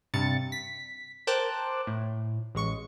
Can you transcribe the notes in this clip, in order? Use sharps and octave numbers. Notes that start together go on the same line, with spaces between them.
G2 C3 A6 C#7
B6
A#4 C5 G5 A5 D6 F#6
A2
A1 G#3 C#6 C#7